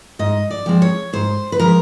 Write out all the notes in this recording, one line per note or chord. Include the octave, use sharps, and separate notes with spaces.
G#2 D#5
D5
F3 G#3 C4
C#5
G#2 C5
B4
F3 G#3 C4 A#4